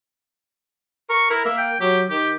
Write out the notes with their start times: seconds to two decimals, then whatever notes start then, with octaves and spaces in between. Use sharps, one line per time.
1.10 A#4 C#6
1.30 E4 A#4
1.45 A#3 E5
1.58 G5
1.80 F#3 G4
2.10 D#3 G4